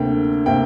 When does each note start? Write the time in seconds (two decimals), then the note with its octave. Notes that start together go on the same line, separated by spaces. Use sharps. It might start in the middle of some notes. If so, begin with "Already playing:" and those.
Already playing: D2 C3 A#3 G5
0.46 C3 A#3 G5